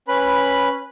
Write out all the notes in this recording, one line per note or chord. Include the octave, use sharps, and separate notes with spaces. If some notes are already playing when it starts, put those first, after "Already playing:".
C#4 B4 B5